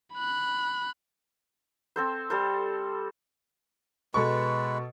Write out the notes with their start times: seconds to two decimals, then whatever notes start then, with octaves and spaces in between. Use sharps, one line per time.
0.14 B5 F#6
1.96 C4 A4 C5
2.30 G3 A4 C5
4.14 B2 G#3 A4 B4 C#6